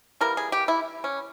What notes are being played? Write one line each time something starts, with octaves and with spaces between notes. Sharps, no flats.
E3 G3 A#3 A#4
G#4
G4
E4
C#4